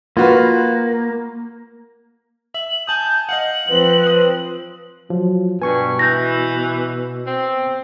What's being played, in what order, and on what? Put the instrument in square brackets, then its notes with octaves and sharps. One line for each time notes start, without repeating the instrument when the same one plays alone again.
[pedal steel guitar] A#3 [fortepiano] F4 F#4 B4
[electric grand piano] E5 [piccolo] F#7
[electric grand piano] G#5 A5 D#6 [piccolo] G6
[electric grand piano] D#5 F5 F#5 [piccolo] F#7
[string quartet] F3 C4 [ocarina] B4
[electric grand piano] D#6
[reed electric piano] F3 [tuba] F#3
[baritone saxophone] G2 [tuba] B2 [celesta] B4 [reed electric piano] G#5 C#6 G#6
[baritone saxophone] E3 [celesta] G6 A#6
[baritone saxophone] C4